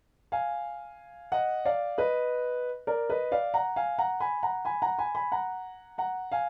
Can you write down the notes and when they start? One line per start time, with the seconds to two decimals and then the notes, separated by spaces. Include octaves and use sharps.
0.32 F5 G#5
1.32 D#5 F#5
1.65 D5 F5
1.98 B4 D#5
2.87 A#4 D5
3.10 B4 D#5
3.32 D5 F5
3.54 F#5 A#5
3.76 F5 G#5
3.98 F#5 A#5
4.20 G#5 B5
4.43 F#5 A#5
4.65 G#5 B5
4.82 F#5 A#5
4.98 G#5 B5
5.15 G#5 B5
5.32 F#5 A#5
5.98 F#5 A#5
6.32 F5 G#5